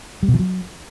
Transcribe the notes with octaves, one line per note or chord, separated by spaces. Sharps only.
G3
B2
E3
F#3